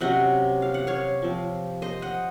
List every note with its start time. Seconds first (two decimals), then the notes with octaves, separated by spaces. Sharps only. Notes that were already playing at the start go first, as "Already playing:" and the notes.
0.01 C3 F#3 C#4 D#5 F#5
0.62 F5
0.74 F#5
0.87 C#5 F5
1.22 F3 C4
1.82 C5 D#5
2.02 D#5 F#5